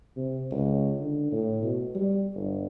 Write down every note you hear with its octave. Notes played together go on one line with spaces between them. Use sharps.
C3
C#2
D3
A2
B2
G3
G1